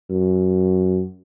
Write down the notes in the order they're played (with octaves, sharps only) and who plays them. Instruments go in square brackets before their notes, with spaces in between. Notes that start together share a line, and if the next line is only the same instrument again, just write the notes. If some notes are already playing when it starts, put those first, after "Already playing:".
[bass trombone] F#2